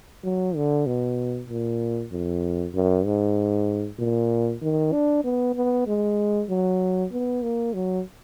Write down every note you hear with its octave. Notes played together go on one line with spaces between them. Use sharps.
F#3
D3
B2
A#2
F2
F#2
G#2
A#2
D#3
D4
B3
B3
G#3
F#3
B3
A#3
F#3